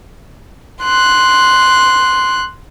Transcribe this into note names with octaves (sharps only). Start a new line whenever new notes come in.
C6 F#6